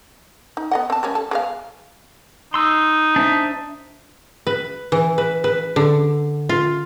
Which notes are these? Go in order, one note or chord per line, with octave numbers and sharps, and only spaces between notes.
D#4
B3 D#5 F#5
C4 A5
G3 A#3 C#4
A4
G#3 B3 F5
D#4 C6 E6
D4 C5 E5
B4
E3
B4
B4
D3
F4